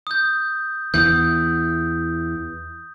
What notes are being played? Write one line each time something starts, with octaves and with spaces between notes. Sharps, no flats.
D#6 G6
E2 E3 D#6 G6